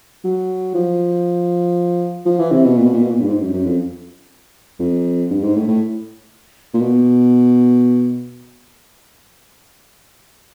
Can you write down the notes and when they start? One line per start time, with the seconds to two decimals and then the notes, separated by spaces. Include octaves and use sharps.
0.24 F#3
0.75 F3
2.26 F3
2.39 E3
2.52 C3
2.64 B2
2.77 A#2
2.85 B2
2.94 A#2
3.03 B2
3.10 A#2
3.21 G2
3.27 G#2
3.41 F#2
3.53 F#2
3.66 F2
4.80 F2
5.31 G2
5.43 G#2
5.56 A2
5.68 A2
6.74 A#2
6.82 B2